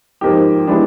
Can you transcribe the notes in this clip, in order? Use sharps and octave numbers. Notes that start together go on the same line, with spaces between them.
G#2 F3 A#3 D#4 G4
E3 G#3 B3 D4 G4